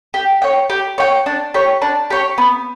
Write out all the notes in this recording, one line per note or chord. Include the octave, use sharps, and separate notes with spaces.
G4
C#5 G5
G4
C#5 G5
D4
G4 C#5
D4
G4 C#5
B3